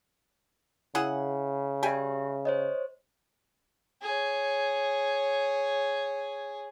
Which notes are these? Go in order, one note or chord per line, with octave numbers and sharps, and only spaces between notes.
C#3 E4 G#4 F#5
G3 G4 E5 G5 G#5
C5 C#5 D#5
G#4 C#5